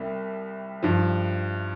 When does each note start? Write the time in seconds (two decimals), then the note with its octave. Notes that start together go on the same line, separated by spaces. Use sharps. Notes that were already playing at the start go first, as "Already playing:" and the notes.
Already playing: C2 C3 G3
0.83 G2 F3